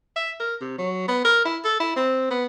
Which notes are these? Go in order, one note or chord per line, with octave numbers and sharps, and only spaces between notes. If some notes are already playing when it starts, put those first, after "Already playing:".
E5
A#4
C3
F#3
B3
A#4
E4
A4
E4
C4
B3